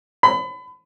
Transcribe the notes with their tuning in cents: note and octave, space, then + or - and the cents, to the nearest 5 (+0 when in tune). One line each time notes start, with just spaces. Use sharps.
B5 +30